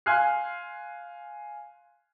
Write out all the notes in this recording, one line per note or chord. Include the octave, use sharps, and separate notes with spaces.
F5 G#5 C6 F6 F#6 C7